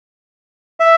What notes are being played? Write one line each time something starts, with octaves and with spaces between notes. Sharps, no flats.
E5